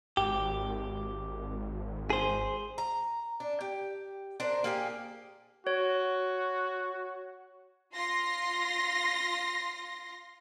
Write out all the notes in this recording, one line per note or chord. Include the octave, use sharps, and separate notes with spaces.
G#1 G4
G#4 C5
A#5
D4
G4
D4 A#4 C5
A#3 G4 G#4
F#4 C#5
F4 C6 A#6